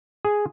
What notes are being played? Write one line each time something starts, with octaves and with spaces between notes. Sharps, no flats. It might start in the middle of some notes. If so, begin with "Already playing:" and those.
G#4